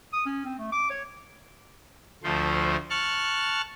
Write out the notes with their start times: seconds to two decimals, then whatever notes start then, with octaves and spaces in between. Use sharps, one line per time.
0.13 D#6
0.26 C#4
0.45 C4
0.59 A3
0.72 D6
0.90 C#5
2.23 D2 F3 A3 C5
2.90 A5 C#6 F6 F#6